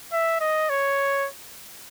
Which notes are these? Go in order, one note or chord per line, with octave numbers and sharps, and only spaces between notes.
E5
D#5
C#5